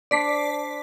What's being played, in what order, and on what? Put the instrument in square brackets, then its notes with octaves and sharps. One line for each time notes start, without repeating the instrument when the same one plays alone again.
[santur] D4 C5 [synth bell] D5 B6 C7